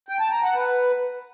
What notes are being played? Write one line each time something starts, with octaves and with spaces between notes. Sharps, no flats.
G5
A5
A#5
F#5
B4